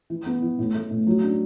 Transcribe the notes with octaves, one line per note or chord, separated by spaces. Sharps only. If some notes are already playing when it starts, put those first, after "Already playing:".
E3
B3
E3
A2
A3
A2
F#3
D4